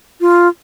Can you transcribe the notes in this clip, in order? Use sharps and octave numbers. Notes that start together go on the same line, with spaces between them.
F4